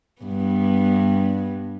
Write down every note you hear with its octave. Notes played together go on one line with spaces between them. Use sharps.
G2 B3